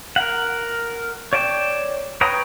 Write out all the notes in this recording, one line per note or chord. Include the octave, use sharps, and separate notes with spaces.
A#4 F#5
C#5 D5 G5 A5
B4 C#5 G5 A#5 D#6